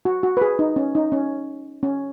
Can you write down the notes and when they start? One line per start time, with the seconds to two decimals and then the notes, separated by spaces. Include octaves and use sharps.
0.05 F#4
0.23 F#4
0.37 B4
0.42 G#4
0.59 D#4
0.76 C#4
0.95 D#4
1.12 C#4
1.83 C#4